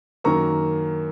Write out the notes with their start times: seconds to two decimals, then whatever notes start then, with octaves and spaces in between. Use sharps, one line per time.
0.24 F#2 D#3 A#3 A#5 C#6